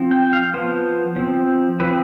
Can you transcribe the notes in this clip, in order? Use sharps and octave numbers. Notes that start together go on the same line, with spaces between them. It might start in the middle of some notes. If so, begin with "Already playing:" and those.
Already playing: F3 C4
G5
F5
F3 B3 C5
F3 C4
F3 C4 B4